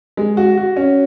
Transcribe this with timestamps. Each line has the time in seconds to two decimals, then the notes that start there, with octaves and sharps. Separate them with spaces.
0.17 G#3
0.37 F#4
0.57 F#4
0.76 C#4